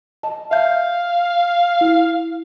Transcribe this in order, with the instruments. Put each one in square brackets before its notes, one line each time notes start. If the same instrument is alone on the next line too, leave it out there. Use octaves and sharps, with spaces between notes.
[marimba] D#5 A5
[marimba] E5 G6 [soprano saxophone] F5
[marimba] E4